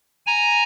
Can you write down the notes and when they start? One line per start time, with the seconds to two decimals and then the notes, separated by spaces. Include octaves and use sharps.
0.27 G#5 A#5